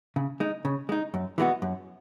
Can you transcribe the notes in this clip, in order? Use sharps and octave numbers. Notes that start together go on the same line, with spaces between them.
C#3
G#3 D#4
C#3
G#3 D#4
F#2
E3 G#3 B3 F#4
F#2